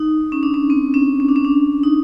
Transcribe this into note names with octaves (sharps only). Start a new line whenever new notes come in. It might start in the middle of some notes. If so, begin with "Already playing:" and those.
Already playing: D#4
C#4
D4
C#4
C4
C#4
C#4
D4
C#4
D4
D#4